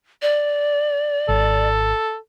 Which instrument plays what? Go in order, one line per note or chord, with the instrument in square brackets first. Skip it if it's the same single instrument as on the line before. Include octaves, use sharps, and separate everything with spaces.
[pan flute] D5
[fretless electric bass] G#1 [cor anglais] A4